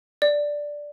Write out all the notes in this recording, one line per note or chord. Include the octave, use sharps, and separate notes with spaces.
D5